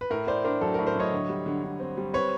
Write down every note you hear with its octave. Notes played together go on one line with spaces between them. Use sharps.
B4
A2 A#4
A2 C5 D5
D4 A#4 C5
F#3 A4
A#4
A2
A#4 C5
F#3 C#5 D#5
D3
G3
D3
D3
C4
G3
C4 B4 C#5